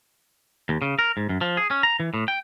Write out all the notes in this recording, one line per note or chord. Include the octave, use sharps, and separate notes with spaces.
D#2
C#3
A#4
G#2
F#2
F3
G#4
C#4
A#5
E3
A2
G5